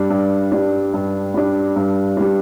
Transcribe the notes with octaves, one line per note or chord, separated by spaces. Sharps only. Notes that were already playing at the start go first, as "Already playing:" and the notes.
Already playing: G2 G3 D4
G2
G3 D4
G2
G3 D4
G2
G3 D4